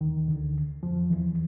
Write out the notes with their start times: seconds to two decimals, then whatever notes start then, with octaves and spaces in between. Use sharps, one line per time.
0.01 D#2 D#3
0.28 D2 D3
0.83 F2 F3
1.10 E2 E3